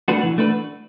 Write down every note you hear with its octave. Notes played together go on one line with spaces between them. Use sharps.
A3 D4 F#4 B4
E3
A3 D4 F#4 B4